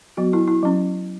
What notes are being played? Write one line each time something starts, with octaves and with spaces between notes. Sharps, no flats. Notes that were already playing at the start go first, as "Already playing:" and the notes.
F#3 B3 F#4
E4
E4
F#3 C#4